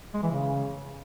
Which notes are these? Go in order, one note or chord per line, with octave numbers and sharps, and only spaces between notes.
G#3
E3
C#3